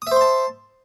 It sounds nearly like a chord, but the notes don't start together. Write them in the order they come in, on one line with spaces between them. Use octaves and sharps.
D#6 E5 C5 C6 A5